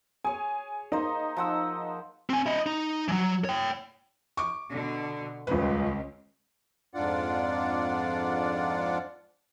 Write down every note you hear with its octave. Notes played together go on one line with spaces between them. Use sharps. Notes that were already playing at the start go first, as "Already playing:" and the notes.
G#4 C#5 G#5
A#3 D#4 C5
F3 F#5 E6
C4 G#5
E4 D#5
D#4
E3 F#3
C#5 G5
C#6 D6
B2 D3
D#1 C#2 B4
F2 G#2 D4 F4 D5 F#5